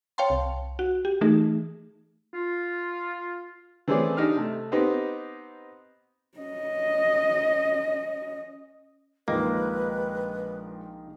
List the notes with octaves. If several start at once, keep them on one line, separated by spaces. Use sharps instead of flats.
C#5 F5 G5 A5 C6
C2
F#4
G4
E3 A3 D#4 G#4
F4
E3 A3 C4 C#4 G#4 D5
D4 D#4 G4 F6
C3 A3
B3 C4 D#4 G4
C#4 D#5
A#1 A#2 D#3 F3 G#3 A#3 B4 D#5